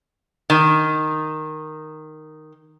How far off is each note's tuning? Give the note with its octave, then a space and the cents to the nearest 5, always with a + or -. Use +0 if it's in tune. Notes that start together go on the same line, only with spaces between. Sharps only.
D#3 -5